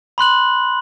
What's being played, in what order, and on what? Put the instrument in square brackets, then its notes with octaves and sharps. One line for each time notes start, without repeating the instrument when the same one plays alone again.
[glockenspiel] B5 C6 F#6 F#7